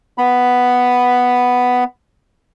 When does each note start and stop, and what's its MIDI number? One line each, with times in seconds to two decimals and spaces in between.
0.18 1.84 59
0.18 1.84 83